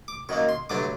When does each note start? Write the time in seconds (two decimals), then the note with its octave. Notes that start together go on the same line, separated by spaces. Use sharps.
0.08 D6
0.29 F#2 D#3 F#3 A#3 C#6
0.49 C6
0.70 G2 D3 F#3 A3 D4 D6